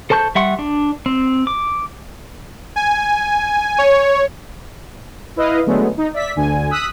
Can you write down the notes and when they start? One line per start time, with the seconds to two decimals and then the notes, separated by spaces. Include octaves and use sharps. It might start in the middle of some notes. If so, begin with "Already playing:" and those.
0.10 A4 C5 A5 C#6 G6
0.35 G3 E5 F#5 C6 C#6
0.59 D4
1.06 C4
1.47 D6
2.76 G#5
3.78 C#5
5.36 E4 B4 D#5 F5
5.66 D3 F#3 G#3 A3 B3
5.97 D#4
6.13 D5 E5 B6
6.36 D2 D3 G#5
6.71 D#6 E6 F#6 B6